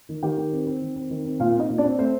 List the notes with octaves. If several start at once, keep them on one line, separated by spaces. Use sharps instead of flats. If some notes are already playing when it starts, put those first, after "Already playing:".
D#3
D#3 G4 G5
D#3
C4
C4
D#3
C4
D#3
C4
A#2 F4 F5
C4
D#4 D#5
A#2
D4 D5
C4
A3 C4 C5